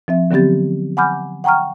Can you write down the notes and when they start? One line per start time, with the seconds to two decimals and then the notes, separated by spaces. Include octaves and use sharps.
0.08 F3 C4 E5
0.31 D3 F#3 B3 C4 G4 A6
0.97 F#5 G#5 B5 D6 F6 G6
1.44 F#5 G5 A#5 C#6 F6